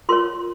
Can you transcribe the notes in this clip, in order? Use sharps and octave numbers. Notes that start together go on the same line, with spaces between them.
F4 A#4 C#5 C6